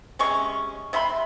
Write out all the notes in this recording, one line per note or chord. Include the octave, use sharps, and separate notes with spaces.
C3 G#3 C#4 C#6
C3 E5 B5 C6